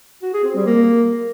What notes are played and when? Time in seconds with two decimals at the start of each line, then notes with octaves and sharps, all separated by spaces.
0.22 F#4
0.33 G#4
0.44 C4
0.55 G3
0.66 A#3